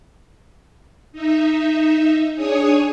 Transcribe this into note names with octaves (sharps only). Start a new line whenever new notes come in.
D#4 E5
D4 G#4 C#5 G#5 D#6